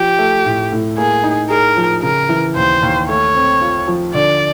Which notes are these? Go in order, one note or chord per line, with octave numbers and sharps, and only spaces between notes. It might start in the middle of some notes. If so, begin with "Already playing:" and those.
Already playing: F3 G4
A3
A2
A2
A#3 G#4
D#4
G#4 A#4
F3
C#3 A#4
E3
D#2 C5
D#2
A3 C#5
C4
F4
F3
D3 D5